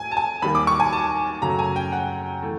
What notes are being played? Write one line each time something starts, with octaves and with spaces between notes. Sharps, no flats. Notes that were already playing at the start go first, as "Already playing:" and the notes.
Already playing: A2 G#5
A5
G#5
D#2 D#3 G3 A#3 B5
D6
C#6
G#5
A5
F#2 C#3 F#3 A3 A#5
G#5
G5
F#5
E3 A3